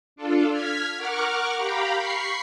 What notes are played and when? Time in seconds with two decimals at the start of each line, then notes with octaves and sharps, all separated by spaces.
0.16 D4 F4 A4
0.50 F6 G#6 B6
0.97 A#4 F#5 C#6 D6 F6
1.56 G4 F5 G5 A#5 B5
1.96 B5 C#6 C7